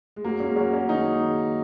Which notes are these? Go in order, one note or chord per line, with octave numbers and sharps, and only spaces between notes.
G#3
F#2 F#3 A#3
G#3 C#4
F#2 C#4 F#4
G#3 C#4
D#3 A#3 D#4
G#4